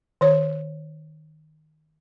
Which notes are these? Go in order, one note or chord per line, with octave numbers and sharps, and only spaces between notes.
D#3 C#5